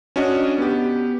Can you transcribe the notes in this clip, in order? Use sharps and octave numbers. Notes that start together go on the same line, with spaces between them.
C#4 D4 F#4 D#5
B3 G4